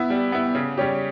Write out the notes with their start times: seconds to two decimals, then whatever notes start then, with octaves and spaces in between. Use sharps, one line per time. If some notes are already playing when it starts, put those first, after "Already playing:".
Already playing: B3 E4
0.10 G3
0.32 B3 E4
0.55 C#3
0.78 G3 C#4 G4